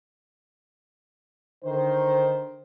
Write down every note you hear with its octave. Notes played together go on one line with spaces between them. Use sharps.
D3 D#3 C5